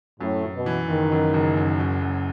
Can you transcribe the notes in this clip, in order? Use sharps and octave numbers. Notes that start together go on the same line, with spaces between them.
F#2 A2
F#2
B2
E3
F#1 D#3
F#2
F#1
F#2
F#2
F#2